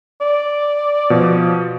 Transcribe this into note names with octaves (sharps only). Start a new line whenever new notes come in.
D5
B2 F3